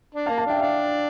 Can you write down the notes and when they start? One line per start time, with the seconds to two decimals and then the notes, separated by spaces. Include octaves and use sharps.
0.15 D4
0.26 F5 A5
0.30 A#3
0.38 F5 A5
0.46 D4 E5 G5
0.56 E5
0.61 D4 F5